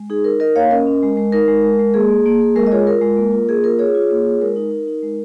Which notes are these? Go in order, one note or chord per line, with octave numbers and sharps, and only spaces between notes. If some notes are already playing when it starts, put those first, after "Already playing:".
Already playing: G#3
D#4 G#4
D#4 A#4
D#4 A#4 D#5
A#3 C#5 F5
C#4 A#4 D#5
C#4
G#3
G#3
D#4 A#4
G#3
G#3
G#3
A#3 G#4
A#3
A#3
A#3
G#3 A#4
D#5
F4 G#4 C#5
F4 A#4
G#3
A#3
F4
A#3 G#4
F4 A#4
F4 G#4 C#5
F4
A#3
F4
G#3 A#4
D#4
D#4
D#4
G#3